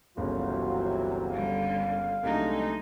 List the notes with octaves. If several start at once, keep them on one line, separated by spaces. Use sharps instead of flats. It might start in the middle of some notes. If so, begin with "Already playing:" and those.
G1 C#2 C3 E3 F#3 A#3 F4
D3 G3 F5
C2 D3 F#3 G#3 A3 D#4